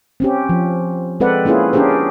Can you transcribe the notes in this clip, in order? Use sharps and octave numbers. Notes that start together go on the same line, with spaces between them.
C4 C#4 G4
F3
G#3 C4 A4 B4 D5 F#5
A#3 C#4 E4 F4 G#4 B4
C#4 D4 G4 G#4 A#4 C5